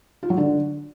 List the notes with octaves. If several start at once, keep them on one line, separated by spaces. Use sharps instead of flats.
F4
F#3
D3